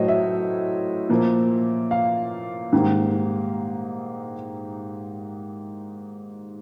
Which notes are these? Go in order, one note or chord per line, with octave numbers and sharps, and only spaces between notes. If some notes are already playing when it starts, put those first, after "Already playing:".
Already playing: A2 F#3 A3 C5 C#5 D#5
E5
A#2 F3 A#3
F5
G#2 D#3 G3 A#3